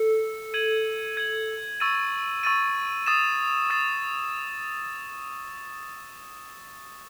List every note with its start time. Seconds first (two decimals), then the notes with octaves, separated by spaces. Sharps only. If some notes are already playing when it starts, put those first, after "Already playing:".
Already playing: A4
0.54 G#6 D#7 F#7
1.17 G#6 D#7 F#7
1.80 C#6 E6 A6 D#7
2.43 C#6 E6 A6 D#7
3.06 D#6 A6 E7
3.70 D#6 A6 E7